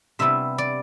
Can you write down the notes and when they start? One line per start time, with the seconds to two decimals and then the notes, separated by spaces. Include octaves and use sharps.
0.19 C3 G3 B3 E4 E5
0.58 D5